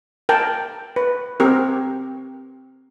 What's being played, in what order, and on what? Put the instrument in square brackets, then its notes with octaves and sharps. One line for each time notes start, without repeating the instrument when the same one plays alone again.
[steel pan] A#4 G5 A5
B4
C4 G4 A#4